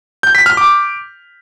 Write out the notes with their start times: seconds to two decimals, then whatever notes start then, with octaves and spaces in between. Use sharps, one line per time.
0.23 G6
0.35 B6
0.46 F6
0.57 D6